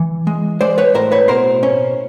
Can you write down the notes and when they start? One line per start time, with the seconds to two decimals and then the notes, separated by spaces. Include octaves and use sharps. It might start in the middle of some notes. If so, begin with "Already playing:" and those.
Already playing: E3
0.27 G#3
0.61 G#3 C5 D5
0.78 B4 C#5
0.94 A2 A#4 C5
1.12 B4 C#5
1.28 B2 A#4 C5
1.63 C#4